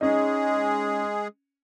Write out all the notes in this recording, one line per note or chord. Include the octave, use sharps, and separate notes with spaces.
G#3 C#4 D#4 G#4